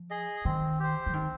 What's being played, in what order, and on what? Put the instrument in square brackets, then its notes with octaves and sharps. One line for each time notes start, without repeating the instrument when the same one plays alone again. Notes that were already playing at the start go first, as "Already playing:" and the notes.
Already playing: [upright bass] F3
[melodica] G#4 D#5
[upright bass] D#3 [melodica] C4
[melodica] G4 C5
[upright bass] F3
[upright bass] D#3 [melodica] C4